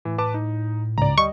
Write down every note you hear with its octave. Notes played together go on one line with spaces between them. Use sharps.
A2 E3
B4 A5 D6
D#4
C#2 G#2 C#3 D5 A#5
D2 G3 D#5 C#6